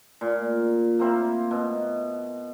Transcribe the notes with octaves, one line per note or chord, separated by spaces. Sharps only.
A#2
A#3 C4 E4
B2